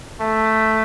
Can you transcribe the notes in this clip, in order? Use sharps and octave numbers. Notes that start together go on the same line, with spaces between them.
A3